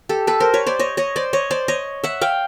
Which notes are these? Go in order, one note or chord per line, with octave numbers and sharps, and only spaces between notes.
G4 A4
A4 B4
A#4 C5
B4 C#5
C5 D5
C#5 D#5
C#5 D#5
C5 D5
C#5 D#5
C5 D5
C#5 D#5
E5 F#5
F5 G5